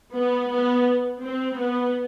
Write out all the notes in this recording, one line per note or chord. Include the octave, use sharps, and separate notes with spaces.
B3
B3
C4
B3